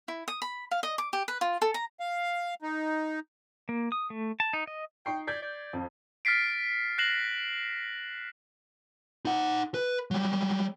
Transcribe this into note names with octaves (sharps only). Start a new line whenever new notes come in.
E4
D#6
B5
F5
D#5
D6
G4
B4
F4
A4
A#5
F5
D#4
A#3
D#6
A3
A5
D#4
D#5
D#4 G5 C#6 C7
D5 G6 G#6 B6
D5
F2
F6 A6 B6 C7 D7
F#6 A#6 C7 E7 F#7
D#4 F#5
B4
F#3 G3